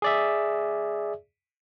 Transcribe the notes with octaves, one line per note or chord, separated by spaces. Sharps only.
G#4 D5 E5